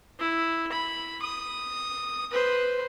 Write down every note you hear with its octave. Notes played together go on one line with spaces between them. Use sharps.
E4
B5
D#6
B4 C5